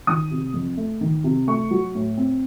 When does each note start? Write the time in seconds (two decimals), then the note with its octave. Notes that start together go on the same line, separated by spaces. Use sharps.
0.07 D#3 D#6
0.31 C3
0.54 F2
0.77 A3
1.01 D#3
1.24 C3
1.47 A3 C#6
1.71 F#3
1.95 A2
2.17 C4